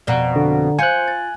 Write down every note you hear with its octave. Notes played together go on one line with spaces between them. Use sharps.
F2 B2 D5 F#5 A#5
D3
F4 C5 G#5 F#6 G6 C#7
A6